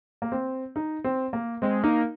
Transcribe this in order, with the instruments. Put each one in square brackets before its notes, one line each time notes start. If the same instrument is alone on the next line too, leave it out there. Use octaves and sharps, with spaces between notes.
[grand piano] A#3
C4
D#4
C4
A#3
[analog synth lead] G#3 [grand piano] C4
[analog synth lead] A#3 [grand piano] D#4